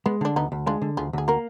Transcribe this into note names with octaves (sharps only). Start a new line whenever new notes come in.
G#3 B3
D3 D4
D2 B3 D#4
D2
G#3 D4 F4
D3
D2 F4 G#4
D2 G#4
A#3 F#4 A#4